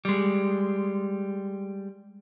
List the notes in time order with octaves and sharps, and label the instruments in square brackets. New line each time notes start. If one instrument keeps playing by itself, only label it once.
[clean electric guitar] G3 G#3